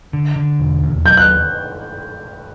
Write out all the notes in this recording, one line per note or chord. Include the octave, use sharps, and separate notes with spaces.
D3
D3
E1
D#2
F#3 G6
F#6